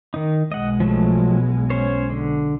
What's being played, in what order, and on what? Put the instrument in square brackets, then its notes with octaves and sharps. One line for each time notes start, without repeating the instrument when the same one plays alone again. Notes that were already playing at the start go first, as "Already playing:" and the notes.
[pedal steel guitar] D#3 D#4
[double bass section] B1 B2 G#3 [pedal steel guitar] D#5 F#5
[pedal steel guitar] F3 F#3 A3
C#4 C5 C#5
D3